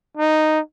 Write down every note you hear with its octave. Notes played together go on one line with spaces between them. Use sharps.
D#4